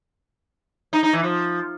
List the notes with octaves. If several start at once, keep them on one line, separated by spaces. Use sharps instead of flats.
D#4
D#4
E3
F3